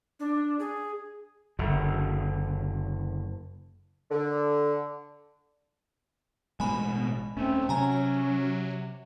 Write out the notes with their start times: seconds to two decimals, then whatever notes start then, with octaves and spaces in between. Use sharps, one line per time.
0.20 D4
0.59 G#4
1.59 F#1 D3
4.11 D3
6.60 A1 B2 G#3 G#5 B5
7.37 D#1 A3 C4 C#4
7.69 C3 F#3 C#4 G#5 A#5